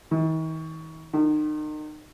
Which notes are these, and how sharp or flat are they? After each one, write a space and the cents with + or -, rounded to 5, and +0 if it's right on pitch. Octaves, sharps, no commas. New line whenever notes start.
D#3 +45
D#3 -35